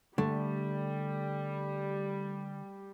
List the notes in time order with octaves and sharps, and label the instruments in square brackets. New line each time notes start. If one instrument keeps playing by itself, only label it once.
[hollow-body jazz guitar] D3 [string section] G3 [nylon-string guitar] A3